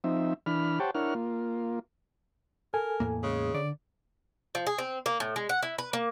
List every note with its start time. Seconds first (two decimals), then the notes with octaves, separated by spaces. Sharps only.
0.04 F3 C4 D#4 E5
0.46 E3 D4 B5 F6
0.80 G4 C5 C#5 F#5 G5 A5
0.95 D4 E4 A#4 C#5 F#5 F6
1.15 A#3 F4
2.74 A4 A#4 G#5
3.00 E2 A2 A#3
3.23 C#3 G#3
3.54 D3 D5
4.55 F3
4.67 G#4
4.78 C4
5.06 A#3
5.20 A2
5.36 G#3
5.49 F#5
5.63 E4
5.78 B4
5.93 A#3